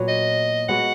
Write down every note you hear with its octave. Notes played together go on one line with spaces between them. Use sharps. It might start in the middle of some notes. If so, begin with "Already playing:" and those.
Already playing: A#2 F#3 B3 F#4
D#5
G#3 B3 F#4 F#5